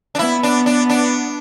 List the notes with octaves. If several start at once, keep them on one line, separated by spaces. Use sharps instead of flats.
D4
B3 E4
D4
D4
D4